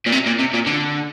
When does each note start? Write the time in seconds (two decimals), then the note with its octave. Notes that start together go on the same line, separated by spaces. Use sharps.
0.06 A#2
0.12 C3
0.26 A#2
0.39 C3
0.53 A#2
0.66 D3